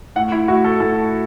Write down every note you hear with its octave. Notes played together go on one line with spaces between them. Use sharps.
A2 F#5
E4
A2 F#4
A4
A2 A4